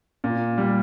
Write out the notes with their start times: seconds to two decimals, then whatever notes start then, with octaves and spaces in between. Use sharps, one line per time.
0.24 A#2
0.58 G3